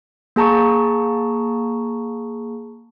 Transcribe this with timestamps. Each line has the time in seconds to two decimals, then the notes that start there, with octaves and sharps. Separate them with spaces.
0.36 A#3 G#4 A5 A#5 C#6